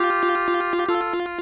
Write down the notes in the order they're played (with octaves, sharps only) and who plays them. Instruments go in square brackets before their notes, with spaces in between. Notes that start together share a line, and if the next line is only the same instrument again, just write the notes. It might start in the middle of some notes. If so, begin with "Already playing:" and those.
Already playing: [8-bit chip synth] F4 [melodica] G4
[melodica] G4
[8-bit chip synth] F4 [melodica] A4